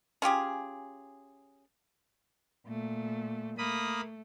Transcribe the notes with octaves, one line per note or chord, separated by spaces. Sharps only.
C#4 F4 G4 G#4
A#2 A3
A3 A#3 B5 D#6